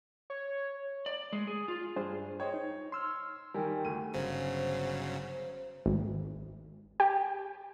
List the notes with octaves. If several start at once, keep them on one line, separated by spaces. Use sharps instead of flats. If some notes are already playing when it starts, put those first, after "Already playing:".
C#5
D5
G#3
G#4
F4
G2 D4 G#4 C5
C5 C#5 D#5 G5
D#4
C6 E6 F6
D#3 G3 A#4 G5 G#5
D2 D#7
G1 C#3 F#3 C5
G#1
G4